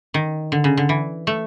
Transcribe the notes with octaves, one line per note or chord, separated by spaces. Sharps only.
D#3
D3
C#3
D3
E3
A3